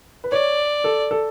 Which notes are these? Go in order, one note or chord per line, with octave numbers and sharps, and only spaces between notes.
B4
C#5 D5
A4
A4